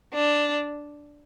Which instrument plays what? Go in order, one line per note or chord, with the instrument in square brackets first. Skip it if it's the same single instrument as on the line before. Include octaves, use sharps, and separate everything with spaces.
[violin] D4